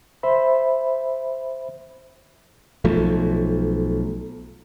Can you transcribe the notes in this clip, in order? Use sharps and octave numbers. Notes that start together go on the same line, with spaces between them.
C5 E5 B5
B1 F3 A3